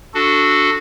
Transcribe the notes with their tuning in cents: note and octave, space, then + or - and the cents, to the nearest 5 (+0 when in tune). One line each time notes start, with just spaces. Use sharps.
D4 +0 F#4 -5 A4 +0